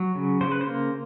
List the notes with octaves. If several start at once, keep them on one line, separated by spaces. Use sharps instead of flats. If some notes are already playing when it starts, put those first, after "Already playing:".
Already playing: F#3
C#3
C#3 C5
B4
C5
A#3